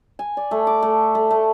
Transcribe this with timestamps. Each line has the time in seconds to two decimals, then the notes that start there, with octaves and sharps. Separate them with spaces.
0.19 G#5
0.37 D5
0.51 A3
0.67 D6
0.82 A3
1.15 A3
1.31 A3